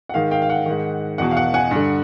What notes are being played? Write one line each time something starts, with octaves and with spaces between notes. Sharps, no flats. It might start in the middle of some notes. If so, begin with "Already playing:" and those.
F#5
G#2 D#3 F5
F5 G5
F5
F#5
G#2 D#3
E2 B2 F#5
F5
F#5
F#5 G#5
G2 D3